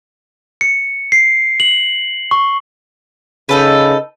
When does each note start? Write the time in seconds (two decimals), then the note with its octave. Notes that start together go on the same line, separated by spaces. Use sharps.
0.61 C#7
1.12 C7
1.60 F#7
2.31 C#6
3.49 C#3 D#4 A4 B4